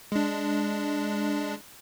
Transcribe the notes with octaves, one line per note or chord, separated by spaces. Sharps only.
G#3 D4